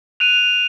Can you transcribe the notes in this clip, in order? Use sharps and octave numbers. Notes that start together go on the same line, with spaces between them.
F#6 D#7 F7